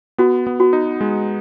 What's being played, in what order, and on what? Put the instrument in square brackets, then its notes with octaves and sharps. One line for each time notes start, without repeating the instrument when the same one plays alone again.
[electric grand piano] B3 [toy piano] F#4
[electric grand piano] B3
[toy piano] F#4
[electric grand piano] D#4
G#3